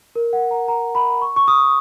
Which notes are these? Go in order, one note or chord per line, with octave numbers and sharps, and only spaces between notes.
A#4
F#5
A#5
A#5
B5
C#6
C#6
D#6